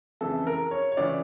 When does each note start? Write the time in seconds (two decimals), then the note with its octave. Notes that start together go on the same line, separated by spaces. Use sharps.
0.21 F2 C#3 E3 A4
0.47 A#4
0.71 C#5
0.92 C#5
0.97 C#2 C#3 E3 D5